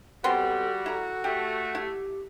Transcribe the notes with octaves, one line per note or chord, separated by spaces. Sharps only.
G3 B3 C4 F#4 A4 C6
E4 A4 A#5
A3 G4
E4 G4